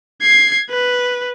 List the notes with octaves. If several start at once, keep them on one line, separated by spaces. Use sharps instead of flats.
G#6 C7
B4